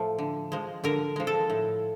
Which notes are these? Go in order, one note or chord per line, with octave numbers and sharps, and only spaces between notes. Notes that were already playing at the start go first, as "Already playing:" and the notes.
Already playing: A2 F3 A3
D3
F3 G#3
D3 A#4
F3 G#3
A4
A2